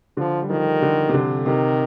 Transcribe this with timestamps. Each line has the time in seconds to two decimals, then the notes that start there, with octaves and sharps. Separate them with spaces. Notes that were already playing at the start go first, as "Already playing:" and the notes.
0.17 D3 F3
0.42 G3
0.50 D#3 F3
0.82 D3
1.09 C3
1.14 D3
1.46 C3 D#3